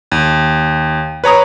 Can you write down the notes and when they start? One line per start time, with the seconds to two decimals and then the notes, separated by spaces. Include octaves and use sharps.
0.12 D#2
1.24 B4 C#5 A#5 D#6